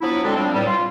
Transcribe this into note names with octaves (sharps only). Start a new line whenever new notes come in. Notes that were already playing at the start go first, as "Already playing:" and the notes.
F3 F#3 B3 D4 E4
D3 F#3 G#3 C4 D4
F3 G3 C4 D4
E2 A2 G3
F4